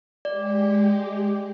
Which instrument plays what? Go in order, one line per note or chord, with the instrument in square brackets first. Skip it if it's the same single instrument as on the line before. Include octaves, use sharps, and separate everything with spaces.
[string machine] G#3 G4 [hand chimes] D5